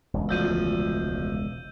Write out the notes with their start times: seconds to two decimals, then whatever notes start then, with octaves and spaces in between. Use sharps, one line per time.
0.14 E1 C#2
0.29 D2 F3 E6 G6 D#7